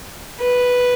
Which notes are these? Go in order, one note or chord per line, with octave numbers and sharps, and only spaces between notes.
B4